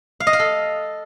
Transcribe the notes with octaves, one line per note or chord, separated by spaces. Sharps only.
F5
D#5
F5
A4